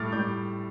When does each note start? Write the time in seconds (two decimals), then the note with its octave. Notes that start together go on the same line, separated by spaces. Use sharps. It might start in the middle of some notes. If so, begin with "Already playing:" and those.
Already playing: A2 G3 D6 F6 A6
0.12 A2 G3 D6 G6